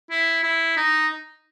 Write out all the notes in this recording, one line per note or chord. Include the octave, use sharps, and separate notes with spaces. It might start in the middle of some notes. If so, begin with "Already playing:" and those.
E4
E4
D#4